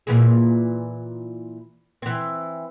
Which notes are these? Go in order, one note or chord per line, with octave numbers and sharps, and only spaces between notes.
A#2 E3 G#4
E3 C4